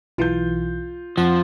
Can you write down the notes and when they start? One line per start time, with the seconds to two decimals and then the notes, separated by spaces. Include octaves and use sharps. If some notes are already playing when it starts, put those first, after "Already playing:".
0.18 B1 E3 F4 G6
1.18 F2 F3 F#5 C6